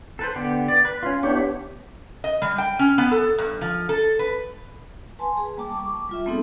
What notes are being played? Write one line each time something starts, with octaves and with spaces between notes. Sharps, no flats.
A4 B4 C5
D3 B3 G4
D5
B4
C#4 F4
B3 D4 E4 G4 C#5
D#5
G3
G5
C#4
B3
A4
G2
F3
A4
B4
B4 G#5 A5 C6
G#4
G3 A#3 G5 A5 D6
C#6 D6
G3 F4 E5
A3 B3 C4 D#4 G#4 A4